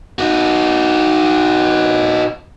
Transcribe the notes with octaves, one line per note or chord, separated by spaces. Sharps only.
D#4 F#4